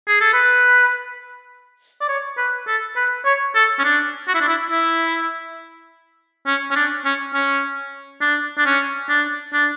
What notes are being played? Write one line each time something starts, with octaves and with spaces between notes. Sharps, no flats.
G#4
A4
B4
D5
C#5
B4
A4
B4
C#5
A4
C#4
D4
F#4
E4
D4
E4
E4
C#4
C#4
D4
C#4
C#4
D4
D4
C#4
D4
D4